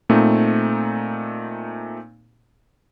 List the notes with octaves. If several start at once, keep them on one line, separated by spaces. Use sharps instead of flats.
A#2 A3 C4 D#4